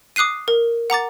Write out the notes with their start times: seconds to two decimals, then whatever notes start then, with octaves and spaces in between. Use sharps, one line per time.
0.16 D6 D#6 F#6 C7 D#7
0.48 A#4
0.90 F#5 A#5 D6 A6